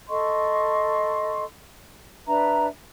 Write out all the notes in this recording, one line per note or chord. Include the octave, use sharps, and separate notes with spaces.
A4 D#5 C6 C#6
D4 B4 E5 A#5